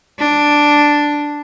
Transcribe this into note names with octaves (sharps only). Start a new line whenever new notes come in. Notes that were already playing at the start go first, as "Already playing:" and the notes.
D4